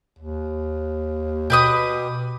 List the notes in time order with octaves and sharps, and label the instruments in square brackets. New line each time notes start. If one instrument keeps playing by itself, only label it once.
[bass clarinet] D#2
[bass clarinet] B2 [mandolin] G4 B4 D#6